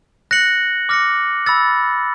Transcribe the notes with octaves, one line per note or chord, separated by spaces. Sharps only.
F#6 A#6 C#7 F#7
D6 F6 A#6 C#7
B5 E6 A6